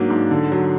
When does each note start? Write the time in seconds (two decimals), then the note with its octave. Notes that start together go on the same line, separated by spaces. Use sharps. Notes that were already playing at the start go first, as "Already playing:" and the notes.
Already playing: G#2 F#3 A#3 D4
0.10 G#2
0.31 D3
0.52 F#3